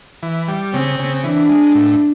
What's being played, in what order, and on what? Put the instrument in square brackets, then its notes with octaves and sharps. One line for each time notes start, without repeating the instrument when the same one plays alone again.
[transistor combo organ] E3
G3
[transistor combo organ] C#3 [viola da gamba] C4
[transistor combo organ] C#3
[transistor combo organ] E3 [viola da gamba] D4
[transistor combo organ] G#3
A2